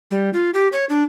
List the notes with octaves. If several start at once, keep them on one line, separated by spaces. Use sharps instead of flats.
G3
F4
G4
C#5
D4